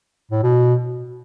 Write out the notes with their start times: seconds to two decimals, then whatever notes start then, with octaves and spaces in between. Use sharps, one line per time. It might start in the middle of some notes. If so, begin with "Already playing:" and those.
0.31 A2
0.43 B2